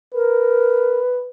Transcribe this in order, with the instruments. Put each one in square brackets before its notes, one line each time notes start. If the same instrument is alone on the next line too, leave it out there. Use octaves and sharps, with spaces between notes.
[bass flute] A#4 [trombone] B4